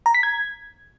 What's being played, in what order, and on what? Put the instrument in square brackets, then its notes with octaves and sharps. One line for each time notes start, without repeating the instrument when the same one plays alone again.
[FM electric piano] A#5
B6
G#6